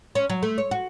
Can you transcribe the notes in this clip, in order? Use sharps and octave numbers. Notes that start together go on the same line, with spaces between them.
C#4
F#3
A3
C#5
F#4